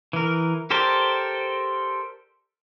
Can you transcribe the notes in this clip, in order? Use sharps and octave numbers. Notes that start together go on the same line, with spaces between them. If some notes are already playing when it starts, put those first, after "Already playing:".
E3 A#4
G4 A4 A#4 C5 D5